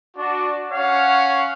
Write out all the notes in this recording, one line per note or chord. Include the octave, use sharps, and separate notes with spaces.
D4 F#4
C#4 C#5 F5 F#5